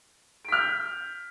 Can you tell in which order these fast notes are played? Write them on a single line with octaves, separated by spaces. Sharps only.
D7 B6 F6 G6